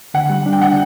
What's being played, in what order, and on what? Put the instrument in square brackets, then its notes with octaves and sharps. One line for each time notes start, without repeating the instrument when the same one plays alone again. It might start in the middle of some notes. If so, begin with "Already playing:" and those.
[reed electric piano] D3 [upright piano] F#5
[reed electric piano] G3
D4
[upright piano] G5
[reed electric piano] D3 [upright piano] F#5